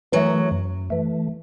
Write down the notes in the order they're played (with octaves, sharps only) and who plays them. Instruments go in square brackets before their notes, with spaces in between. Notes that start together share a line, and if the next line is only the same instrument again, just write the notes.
[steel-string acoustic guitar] F#2 F#3 [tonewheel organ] E3 A3
[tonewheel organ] F#2
E3 A3